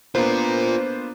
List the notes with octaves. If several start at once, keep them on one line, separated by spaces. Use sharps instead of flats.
A#3 B3 D4 F4 A#4 C5